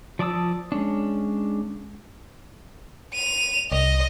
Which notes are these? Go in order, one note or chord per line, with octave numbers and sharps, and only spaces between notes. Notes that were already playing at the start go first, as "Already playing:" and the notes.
F3 D5 A5 D#6 E6
G#3 C#4 D4
D#7 F7
C2 D#5